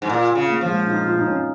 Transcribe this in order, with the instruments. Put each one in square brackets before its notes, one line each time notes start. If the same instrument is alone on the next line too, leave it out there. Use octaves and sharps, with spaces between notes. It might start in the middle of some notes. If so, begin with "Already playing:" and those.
[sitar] G#2
[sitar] A#2 [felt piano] F4
[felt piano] F4
[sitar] C#3
[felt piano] A#3
[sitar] F3
[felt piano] G#3
D#4
F4
D#4
C#4